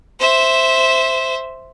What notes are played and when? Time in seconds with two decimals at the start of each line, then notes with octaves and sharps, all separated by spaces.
0.20 C5 E5